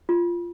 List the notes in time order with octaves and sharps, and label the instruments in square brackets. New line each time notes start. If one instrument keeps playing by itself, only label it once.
[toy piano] F4